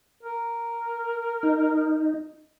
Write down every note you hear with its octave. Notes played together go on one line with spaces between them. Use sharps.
A#4
D#4